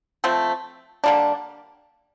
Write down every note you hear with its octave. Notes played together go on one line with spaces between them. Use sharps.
F3 A3 C4
D3 G3 A#3 D4